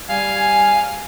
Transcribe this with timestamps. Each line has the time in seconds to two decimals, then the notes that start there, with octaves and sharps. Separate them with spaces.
0.09 G3 F5 G#5